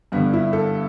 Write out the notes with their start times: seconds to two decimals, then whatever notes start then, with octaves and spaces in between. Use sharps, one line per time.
0.12 G2 B3
0.16 D3
0.33 E4
0.53 A4